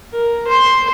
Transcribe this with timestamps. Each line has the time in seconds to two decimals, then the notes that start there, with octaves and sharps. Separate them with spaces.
0.13 A#4
0.48 C5 C6